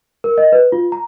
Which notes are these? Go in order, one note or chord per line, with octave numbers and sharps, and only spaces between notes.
A#4
D#5
B4
F4
A#5